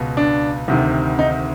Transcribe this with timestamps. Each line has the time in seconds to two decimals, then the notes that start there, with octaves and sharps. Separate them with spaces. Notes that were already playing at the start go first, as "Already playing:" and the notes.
Already playing: C#2 B2
0.17 D4
0.68 D2 C3 D#3
1.19 D#4